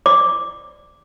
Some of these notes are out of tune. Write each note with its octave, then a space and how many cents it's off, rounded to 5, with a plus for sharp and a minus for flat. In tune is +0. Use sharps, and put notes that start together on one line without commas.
D5 +0 D6 +0